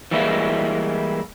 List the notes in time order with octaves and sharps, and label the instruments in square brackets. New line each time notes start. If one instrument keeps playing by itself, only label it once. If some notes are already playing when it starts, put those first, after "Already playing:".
[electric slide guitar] E3 G3 G#3 A#3 E4